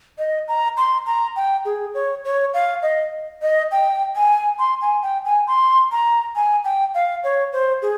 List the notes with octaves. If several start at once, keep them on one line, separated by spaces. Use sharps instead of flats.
D#5
A#5
C6
A#5
G5
G#4
C#5
C#5
F5
D#5
D#5
G5
G#5
C6
G#5
G5
G#5
C6
A#5
G#5
G5
F5
C#5
C5
G#4